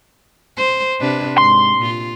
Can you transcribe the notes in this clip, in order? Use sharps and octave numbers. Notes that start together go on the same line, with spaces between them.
C5
C3 D4 B4
G#2 C6
A#2 F4